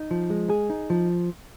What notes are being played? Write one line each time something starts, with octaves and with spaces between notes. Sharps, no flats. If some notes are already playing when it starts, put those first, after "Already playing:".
Already playing: D#4
F3
G#3
G#4
D#4
F3